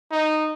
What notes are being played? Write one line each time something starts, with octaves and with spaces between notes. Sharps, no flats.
D#4